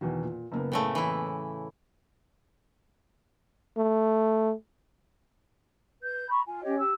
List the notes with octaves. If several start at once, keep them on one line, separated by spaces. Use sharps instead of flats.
E2 B2 D#3
A#2
F#1 A#3 B3
A2 C#3 A3
E3 E4
A3
B4 G6
A#5 B5 C#6
F4 G#5
C#4 G4 C#5 D#5
G4 E6